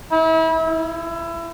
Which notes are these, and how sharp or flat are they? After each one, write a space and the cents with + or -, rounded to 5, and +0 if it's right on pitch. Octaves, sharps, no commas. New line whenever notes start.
E4 -35
E4 +25